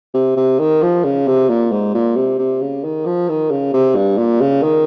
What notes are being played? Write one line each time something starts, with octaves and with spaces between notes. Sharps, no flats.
C3
C3
D#3
F3
C#3
C3
A#2
G#2
A#2
C3
C3
C#3
D#3
F3
D#3
C#3
C3
G2
A#2
C#3
D#3